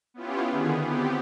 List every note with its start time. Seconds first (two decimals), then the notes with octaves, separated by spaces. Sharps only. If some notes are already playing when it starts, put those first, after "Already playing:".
0.14 B3 C#4 E4 F4 G4
0.49 D3 D#3 B3 G#4
0.82 B3 C4 G4